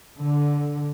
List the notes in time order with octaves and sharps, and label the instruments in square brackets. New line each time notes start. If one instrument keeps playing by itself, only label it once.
[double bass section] D3